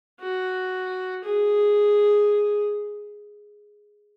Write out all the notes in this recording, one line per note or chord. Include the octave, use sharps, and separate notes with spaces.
F#4
G#4